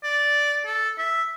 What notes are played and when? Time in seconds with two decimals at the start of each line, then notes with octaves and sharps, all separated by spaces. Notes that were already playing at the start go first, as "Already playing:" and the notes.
0.03 D5
0.65 A4
0.98 E5